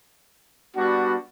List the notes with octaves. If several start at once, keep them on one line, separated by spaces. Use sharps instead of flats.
G3 B3 D4 F#4